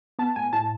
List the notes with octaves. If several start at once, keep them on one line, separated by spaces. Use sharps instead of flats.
B3 A5
A2 G#5
A2 A5